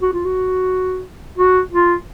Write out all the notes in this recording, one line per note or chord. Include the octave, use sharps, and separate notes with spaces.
F#4
F4
F#4
F#4
F4